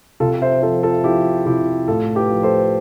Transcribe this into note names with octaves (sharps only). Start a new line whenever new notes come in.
C3 F4 A4
C5 E5
F3 A4 C5
F4 A4
F3 E4 G4
C3 E4 G4
A2 F4 A4
G4 B4
F3
A4 C5